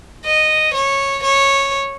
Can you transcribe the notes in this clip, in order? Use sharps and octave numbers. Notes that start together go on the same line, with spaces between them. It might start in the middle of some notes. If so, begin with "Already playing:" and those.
D#5
C#5
C#5